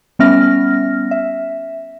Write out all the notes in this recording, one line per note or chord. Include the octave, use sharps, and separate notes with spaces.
G3 B3 C#4 E5 F6 A#6
E5